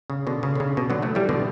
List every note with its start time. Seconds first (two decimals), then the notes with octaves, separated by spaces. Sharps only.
0.10 C#3
0.27 B2 D3
0.43 C#3
0.56 D3
0.60 C#3
0.77 B2
0.90 D3 F#3
1.02 F#3 A3
1.15 E3 G3
1.29 B2 D3